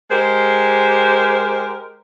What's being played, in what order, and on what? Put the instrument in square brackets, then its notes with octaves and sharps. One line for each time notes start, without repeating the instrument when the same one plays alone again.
[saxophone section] G#3 G4 A#4 C5